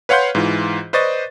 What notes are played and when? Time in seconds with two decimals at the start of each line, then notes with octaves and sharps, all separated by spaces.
0.09 B4 C#5 F5 F#5 C6 G6
0.35 G#2 E3 F4
0.93 B4 C5 D5 D#5 C#6 A6